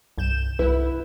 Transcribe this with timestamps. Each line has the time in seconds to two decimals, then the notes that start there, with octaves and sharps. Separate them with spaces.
0.18 C2 G2 G6 E7
0.59 C2 E4 B4